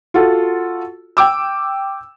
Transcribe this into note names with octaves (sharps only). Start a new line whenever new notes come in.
F4 F#4 A4
G5 D6 E6